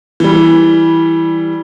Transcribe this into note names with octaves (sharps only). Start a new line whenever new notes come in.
E3 G3